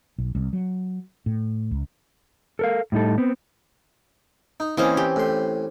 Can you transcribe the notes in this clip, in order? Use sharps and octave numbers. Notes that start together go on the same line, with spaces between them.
B1
C2
F#3
A2
C#2
A4 A#4 F5
A2 G3 D#4 A4
B3 C4
D#4
E3 A#3 C4 C#4 D#5 G#5
G4
A2 C6